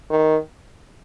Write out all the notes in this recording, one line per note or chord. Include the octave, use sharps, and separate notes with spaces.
D#3